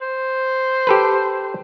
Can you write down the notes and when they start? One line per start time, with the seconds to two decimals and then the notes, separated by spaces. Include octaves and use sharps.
0.02 C5
0.87 G4 A4 B4